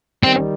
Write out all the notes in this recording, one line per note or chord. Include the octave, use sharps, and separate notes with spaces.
D#3 G3 C4